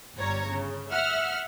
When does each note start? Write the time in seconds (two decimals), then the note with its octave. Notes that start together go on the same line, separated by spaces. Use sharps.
0.16 G1 G3 C#5 A#5
0.48 C#3
0.90 E5 F#5 F6